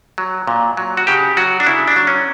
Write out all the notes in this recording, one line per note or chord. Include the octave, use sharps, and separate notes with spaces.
F#3
A#2
F#3
F#4
C#3 G4
F#3 F#4
D4
C#3 E4
D4
F#3
C#4